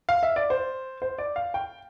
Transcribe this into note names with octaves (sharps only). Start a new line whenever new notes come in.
F5
E5
D5
C5
C5
D5
F5
G5